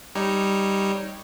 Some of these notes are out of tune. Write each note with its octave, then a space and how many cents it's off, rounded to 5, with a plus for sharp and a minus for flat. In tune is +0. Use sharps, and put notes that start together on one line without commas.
G3 +0 D#4 +0 C#5 -10